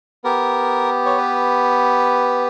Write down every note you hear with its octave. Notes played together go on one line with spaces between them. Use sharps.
B3 G4 A#4
C#5
B4